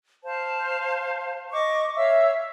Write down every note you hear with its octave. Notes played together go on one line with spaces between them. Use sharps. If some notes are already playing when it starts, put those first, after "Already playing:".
C5 F5 A5
D#5 C#6 D6
C#5 E5 F5 E6